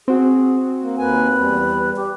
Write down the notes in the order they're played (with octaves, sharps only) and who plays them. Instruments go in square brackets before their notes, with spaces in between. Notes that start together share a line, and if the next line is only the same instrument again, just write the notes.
[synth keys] C4 F#4 [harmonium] G#4
[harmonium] A#3
[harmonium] D#2 A#3 G#5 [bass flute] B4
[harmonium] E2 G3
[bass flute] G4